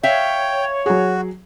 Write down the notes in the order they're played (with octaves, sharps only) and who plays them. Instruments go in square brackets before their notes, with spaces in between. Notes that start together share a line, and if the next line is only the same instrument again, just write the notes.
[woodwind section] C#5 [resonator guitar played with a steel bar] E5 F5 [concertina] G5
[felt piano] F#3 G#4 [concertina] F#4